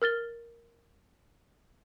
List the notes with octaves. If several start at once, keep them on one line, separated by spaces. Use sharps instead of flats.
A#4 F6 A6 G7